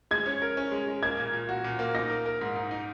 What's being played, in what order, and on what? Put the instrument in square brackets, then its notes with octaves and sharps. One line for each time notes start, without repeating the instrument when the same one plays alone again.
[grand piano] G#3 [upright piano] G#6
[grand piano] C#4
A#4
C#4
G#3
G#3
[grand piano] A#3 [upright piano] G#6
[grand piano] A#2
A#2
F#4
A#2
A#3
[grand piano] D#4 [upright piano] A#6
[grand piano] A#4
A#4
G#2
D#4
D#4